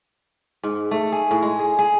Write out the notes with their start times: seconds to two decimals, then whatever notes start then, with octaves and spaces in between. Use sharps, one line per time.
0.63 G#2
0.91 A3
1.12 G#4
1.31 A2
1.42 G#3
1.59 G#4
1.79 G#4